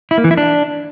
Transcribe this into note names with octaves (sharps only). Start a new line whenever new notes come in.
E4
A#3
E3
E4
D4